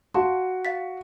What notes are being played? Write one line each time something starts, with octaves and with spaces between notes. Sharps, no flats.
F#4 F5 A5 C6
F5 A6 B6